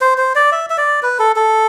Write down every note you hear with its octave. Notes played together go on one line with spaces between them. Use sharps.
C5
C5
D5
E5
E5
D5
B4
A4
A4